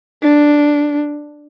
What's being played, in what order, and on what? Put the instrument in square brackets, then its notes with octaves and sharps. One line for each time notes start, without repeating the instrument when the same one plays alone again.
[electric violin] D4